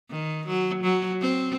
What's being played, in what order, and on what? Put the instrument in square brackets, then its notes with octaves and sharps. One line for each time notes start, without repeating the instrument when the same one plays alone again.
[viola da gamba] D#3
F#3
F#3
C4